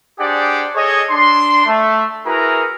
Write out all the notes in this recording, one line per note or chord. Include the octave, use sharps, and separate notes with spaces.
D4 G4 G#4 C5 D5 F#5
G#4 A4 C#5 D#5
D4 C6
A3
E4 F#4 G#4 A#4 B4 A#5